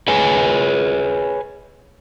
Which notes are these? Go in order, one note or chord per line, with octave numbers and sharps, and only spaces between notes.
G#4 B4 C#5 G#5